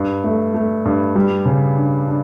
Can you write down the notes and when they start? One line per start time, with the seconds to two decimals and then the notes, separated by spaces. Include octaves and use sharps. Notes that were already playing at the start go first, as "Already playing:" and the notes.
Already playing: G2
0.24 A3
0.54 A3
0.85 G2
1.16 G3
1.45 C#3
1.77 D4
2.08 D4